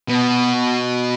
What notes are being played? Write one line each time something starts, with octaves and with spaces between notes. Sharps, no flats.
B2